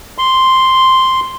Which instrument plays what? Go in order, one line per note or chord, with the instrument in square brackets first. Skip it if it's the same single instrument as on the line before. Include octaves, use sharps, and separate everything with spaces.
[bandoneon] C6